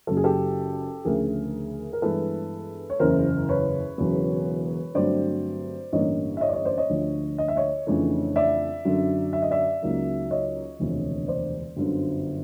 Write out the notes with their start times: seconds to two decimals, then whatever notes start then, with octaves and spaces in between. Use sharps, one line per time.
0.07 F#1 F#2 C#3 F#3 A4
0.17 G#4
0.24 G4 A4
1.05 D2 C#3 F3 A3 G#4 A#4
1.93 A#4
2.02 G2 E3 G#3 B3 A4 B4
2.90 C#5
2.99 F#1 E2 C#3 E3 A#4 C5
3.49 B4 C#5
3.98 E1 E2 C#3 F#3 B3
4.95 G2 D3 F#3 A3 C4 C5 D5
5.92 A1 G2 D3 G3 A#3 C#5 D#5
6.37 E5
6.41 C#5 D#5
6.49 D5
6.53 C#5 D#5
6.65 C5 D5
6.78 C#5 D#5
6.90 D2 D3 F3
7.38 D#5
7.48 E5
7.56 C#5 D#5
7.87 F2 C#3 E3 A3 D4
8.36 D5 E5
8.85 F#2 D3 F#3
9.33 E5
9.42 D#5
9.51 D5 E5
9.82 C#2 C#3 F#3 A#3 D#4
10.31 C#5 D#5
10.79 E1 D2 C3 F3
11.28 C5 D5
11.76 G1 F#2 D3 F#3